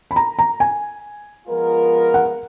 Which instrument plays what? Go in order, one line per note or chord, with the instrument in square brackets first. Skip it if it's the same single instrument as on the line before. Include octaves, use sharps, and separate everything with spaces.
[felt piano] B5
A#5
A#5
G#5
[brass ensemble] F3 G#3 B3 F4 A#4
[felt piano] F#5